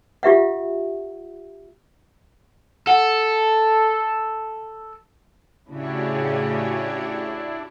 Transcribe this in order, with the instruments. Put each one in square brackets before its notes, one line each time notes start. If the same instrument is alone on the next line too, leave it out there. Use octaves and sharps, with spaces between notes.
[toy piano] F4 G4 E5 F#5
[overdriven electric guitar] A4 [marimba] F#5
[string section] A2 C#3 [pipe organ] D4 E4 [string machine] F#4 G4 C#5